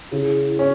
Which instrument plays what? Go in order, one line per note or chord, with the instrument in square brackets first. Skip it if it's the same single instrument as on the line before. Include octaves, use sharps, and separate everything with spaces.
[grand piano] C#3 [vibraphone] E4 G#4
[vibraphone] E4
[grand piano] C#4